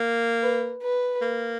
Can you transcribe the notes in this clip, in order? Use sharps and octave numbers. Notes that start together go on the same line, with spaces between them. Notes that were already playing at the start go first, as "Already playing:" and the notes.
Already playing: A#3
B4
B4
A#3